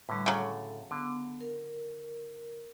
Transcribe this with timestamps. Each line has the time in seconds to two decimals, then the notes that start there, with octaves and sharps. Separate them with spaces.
0.09 A2 D3 G3 B4
0.26 C#3 F#3 A4
0.91 D3 B3
1.41 A#4